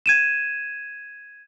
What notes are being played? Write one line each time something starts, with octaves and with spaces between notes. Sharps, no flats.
G#6 D#7 E7